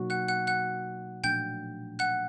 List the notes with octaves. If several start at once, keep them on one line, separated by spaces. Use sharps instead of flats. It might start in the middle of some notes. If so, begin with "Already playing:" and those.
Already playing: B2 F#3 A#3 D#4 F#4
F#5 F#6
F#5 F#6
F#5 F#6
A#2 F3 A3 D4 G5 G6
F#5 F#6